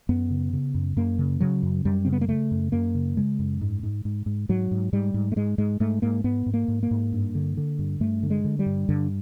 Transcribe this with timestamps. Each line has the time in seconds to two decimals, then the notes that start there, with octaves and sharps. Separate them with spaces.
0.09 F#2 B3
0.31 C#3
0.53 C#3
0.74 F#2
0.97 F#2 A#3
1.19 C#3
1.40 C#3 F#3
1.63 F#2
1.85 F#2 G3
2.05 C#3 C4
2.12 B3
2.21 A#3
2.28 C#3 A3
2.51 F#2
2.72 F#2 A#3
2.95 C#3
3.17 C#3 G#3
3.39 F#2
3.61 G#2
3.83 G#2
4.05 G#2
4.26 G#2
4.49 G#2 F#3
4.71 G#2
4.93 G#2 G3
5.14 G#2
5.32 A3
5.36 G#2 G#3
5.58 G#2 G#3
5.80 G#2 A3
6.02 G#2 A#3
6.24 G#2 B3
6.46 G#2
6.54 A#3
6.68 G#2
6.83 A#3
6.91 G#2
7.12 G2
7.35 D3
7.57 D3
7.79 G2
8.00 G2 A3
8.23 D3
8.30 G#3
8.44 D3
8.59 G3
8.66 G2
8.89 G2 D3